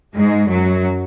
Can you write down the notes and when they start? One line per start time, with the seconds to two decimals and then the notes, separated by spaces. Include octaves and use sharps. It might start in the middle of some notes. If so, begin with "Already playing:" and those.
0.15 G#2 G#3
0.49 F#2 F#3